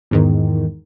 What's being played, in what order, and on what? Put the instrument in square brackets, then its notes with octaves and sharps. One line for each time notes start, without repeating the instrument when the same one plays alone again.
[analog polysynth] E2 G#2 D#3